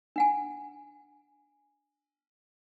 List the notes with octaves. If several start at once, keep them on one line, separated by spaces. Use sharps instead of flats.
D4 F#5 G#5